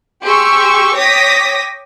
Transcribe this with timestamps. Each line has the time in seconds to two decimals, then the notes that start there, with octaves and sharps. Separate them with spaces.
0.23 G4 G#4 C6 C#6 E6
0.95 C#5 G5 D6 D#6 A#6 B6